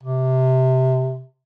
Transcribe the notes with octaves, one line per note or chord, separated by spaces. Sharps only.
C3